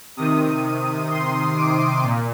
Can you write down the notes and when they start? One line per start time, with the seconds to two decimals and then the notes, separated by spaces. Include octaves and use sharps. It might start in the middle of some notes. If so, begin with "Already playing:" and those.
0.17 C3 D#3 D#6
1.10 C6
1.57 D6
2.04 A#2